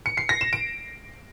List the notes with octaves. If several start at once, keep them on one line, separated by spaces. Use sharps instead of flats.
C#7
C7
A#6
E7
D7